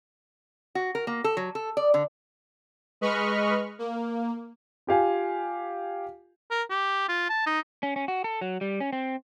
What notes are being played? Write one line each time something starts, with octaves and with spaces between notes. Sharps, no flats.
F#4
A#4
A#3
A4
F#3
A4
D5
D3
G#3 B4 D#5 B5 C#6 F6
A#3
F4 G4 F5 G#5
A#4
G4
F4
A5
D#4
C#4
C#4
F#4
A4
F#3
G3
C#4
C4